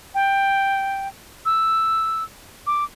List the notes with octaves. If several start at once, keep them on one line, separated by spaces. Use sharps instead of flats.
G5
E6
D6